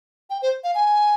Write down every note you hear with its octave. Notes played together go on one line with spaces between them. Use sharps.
G5
C5
F5
G#5